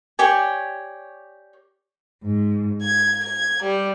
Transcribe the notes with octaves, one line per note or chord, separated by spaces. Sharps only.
G4 C#5 D5 G#5
G#2
G#6
G#6
G3